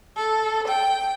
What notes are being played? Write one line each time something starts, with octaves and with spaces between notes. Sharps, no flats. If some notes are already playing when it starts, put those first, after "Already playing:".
A4
G5